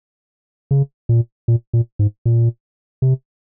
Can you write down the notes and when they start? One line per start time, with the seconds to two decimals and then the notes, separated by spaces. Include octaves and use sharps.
0.71 C#3
1.09 A#2
1.48 A#2
1.73 A#2
1.99 G#2
2.26 A#2
3.02 C3